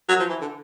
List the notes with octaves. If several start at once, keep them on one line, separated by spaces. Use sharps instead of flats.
F#3
F3
E3
D3